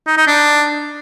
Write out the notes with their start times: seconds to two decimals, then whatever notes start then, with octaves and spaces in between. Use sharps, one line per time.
0.07 D#4
0.17 D#4
0.27 D4